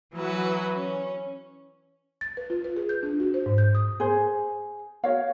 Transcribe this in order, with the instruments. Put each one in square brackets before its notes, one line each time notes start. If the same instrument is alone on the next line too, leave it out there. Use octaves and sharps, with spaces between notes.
[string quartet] E3 F#3 F#4 B4
C#4
[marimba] A6
B4
F4
B4
G#4
G6
D4
F#4
C5
G#2
G6
D#6
[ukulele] G#4 C5
F#4 C#5 F5